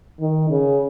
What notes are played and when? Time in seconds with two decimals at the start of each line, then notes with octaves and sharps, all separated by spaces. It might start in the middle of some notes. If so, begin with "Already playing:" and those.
0.20 D#3
0.50 C#3